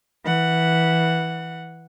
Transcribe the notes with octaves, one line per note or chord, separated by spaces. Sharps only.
E3 F#5